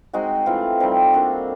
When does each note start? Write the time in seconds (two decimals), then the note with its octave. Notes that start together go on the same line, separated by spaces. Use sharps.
0.13 G#3 C4 D#4 F#4
0.46 E3 A3 C4 F4
0.80 G3 C4 D#4 G4
1.14 A#3 D4 F#4 A4